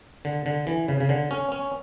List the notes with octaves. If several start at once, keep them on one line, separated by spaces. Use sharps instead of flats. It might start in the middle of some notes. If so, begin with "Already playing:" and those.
D3
D3
E3
C#3
C#3
D3
C#4
C#4